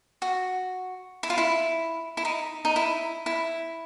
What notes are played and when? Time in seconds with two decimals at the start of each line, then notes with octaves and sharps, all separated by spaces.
0.22 F#4
1.23 E4
1.30 F4
1.38 E4
2.17 E4
2.25 D#4
2.65 D#4
2.76 E4
3.26 E4